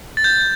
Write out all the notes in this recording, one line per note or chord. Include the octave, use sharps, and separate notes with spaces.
A6
G6